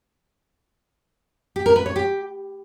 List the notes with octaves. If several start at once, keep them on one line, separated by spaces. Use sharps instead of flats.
G4
A#4
B4
C#5
G4